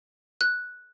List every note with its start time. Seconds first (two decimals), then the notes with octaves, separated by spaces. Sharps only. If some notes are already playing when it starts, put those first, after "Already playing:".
0.41 F#6